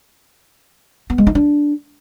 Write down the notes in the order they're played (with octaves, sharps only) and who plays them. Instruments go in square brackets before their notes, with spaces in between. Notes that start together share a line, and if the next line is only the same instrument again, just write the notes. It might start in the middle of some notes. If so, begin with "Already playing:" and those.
[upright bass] B3
G#3
D#4
D4